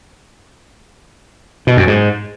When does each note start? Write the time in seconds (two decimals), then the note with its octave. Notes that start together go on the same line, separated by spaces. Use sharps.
1.67 B2
1.77 F#2
1.87 G#2